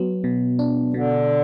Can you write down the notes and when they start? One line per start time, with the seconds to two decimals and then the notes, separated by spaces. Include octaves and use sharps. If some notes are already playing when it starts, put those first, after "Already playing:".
Already playing: F#3 B3
0.24 B2
0.59 D4
0.94 B2 D3